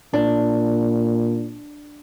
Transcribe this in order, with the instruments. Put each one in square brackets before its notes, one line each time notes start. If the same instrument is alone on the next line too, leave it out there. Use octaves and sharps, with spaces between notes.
[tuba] A#2 [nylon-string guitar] D4